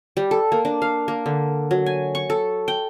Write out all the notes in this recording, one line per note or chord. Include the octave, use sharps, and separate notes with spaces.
G3
A4
A#3
D4
F5
A#3
D3
F#3
G#5
C#6
A4
G5